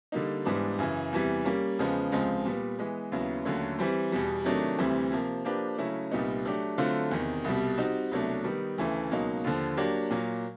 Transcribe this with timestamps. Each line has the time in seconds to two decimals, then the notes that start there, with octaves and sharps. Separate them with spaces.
0.12 D3 G3 A#3 D#4
0.45 G#2 E3 G3 B3 D4
0.79 F#2 C#3 E3
1.13 E2 C3 E3 G3
1.45 G3 A#3 C#4
1.79 E2 C#3 F3 G#3 B3
2.12 C#2 C3 F3 G#3
2.45 A#2 G3 B3
2.79 E3 G#3 B3
3.12 D#2 C#3 F#3 B3 E4
3.45 D#2 D3 F#3 A3 C#4
3.79 E3 G3 C4
4.12 E2 B2 G3
4.44 C3 D#3 F#3 A3 D4
4.78 D2 C3 E3 G3 C4
5.11 C3 F3 A#3
5.45 F3 A#3 D4 G4 B4
5.78 C#3 F#3 A3 C#4 E4
6.11 C2 A#2 G3 B3 D#4
6.45 F#3 A3 D4 G4
6.78 D3 F#3 A3 C4 F4
7.11 E2 C3 D#3
7.44 C2 B2 G3
7.78 G3 C4 D#4 F#4
8.11 C2 B2 F#3 A3 D4
8.44 D#3 G3 B3
8.78 D2 C#3 E3 A3
9.11 C#2 B2 F#3 A#3 D#4
9.44 D#2 D3 F3
9.77 F#3 A#3 D4 G4
10.10 A#2 F#3 A#3